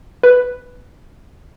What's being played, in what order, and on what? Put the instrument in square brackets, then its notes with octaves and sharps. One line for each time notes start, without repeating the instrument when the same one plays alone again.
[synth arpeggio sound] B4